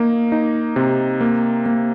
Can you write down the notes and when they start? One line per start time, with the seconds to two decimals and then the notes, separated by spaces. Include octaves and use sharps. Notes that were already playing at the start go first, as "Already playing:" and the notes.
Already playing: A#3 D#4
0.32 D#4
0.76 C3
1.21 A#3
1.66 A#3